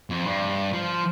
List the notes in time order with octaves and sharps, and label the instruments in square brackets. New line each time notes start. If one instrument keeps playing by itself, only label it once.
[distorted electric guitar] F2
G2
F3